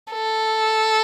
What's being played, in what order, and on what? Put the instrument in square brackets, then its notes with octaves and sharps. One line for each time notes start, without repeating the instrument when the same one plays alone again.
[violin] A4